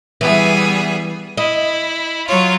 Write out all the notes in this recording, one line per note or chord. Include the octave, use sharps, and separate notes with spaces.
E3 G3 B3 G#4
E4 D#5
F#3 F4 C#5